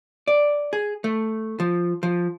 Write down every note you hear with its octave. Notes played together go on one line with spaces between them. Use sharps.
D5
G#4
A3
F3
F3